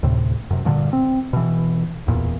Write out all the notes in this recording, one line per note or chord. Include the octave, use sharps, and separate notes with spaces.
D2 A2 C3
F#2 C3
G2 A#2 D3
C4
B2 E3
D1 E2 A#2